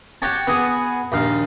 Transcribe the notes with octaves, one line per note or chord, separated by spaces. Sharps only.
F#4 G4 C#5 A5
B3 F#4 G#4
A#1 D#2 F5